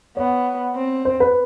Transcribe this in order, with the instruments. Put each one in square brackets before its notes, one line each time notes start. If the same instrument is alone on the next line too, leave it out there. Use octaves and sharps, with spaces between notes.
[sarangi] B3 [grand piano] C#5
[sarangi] C4
[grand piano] C5
B4